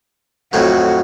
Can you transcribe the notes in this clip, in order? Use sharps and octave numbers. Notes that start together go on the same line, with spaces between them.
F2 A2 F#3 F#4